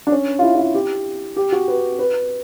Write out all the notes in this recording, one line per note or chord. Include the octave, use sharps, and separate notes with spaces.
D4
C#4
F4
E4
E4
F4
G4
G4
F#4
B4
B4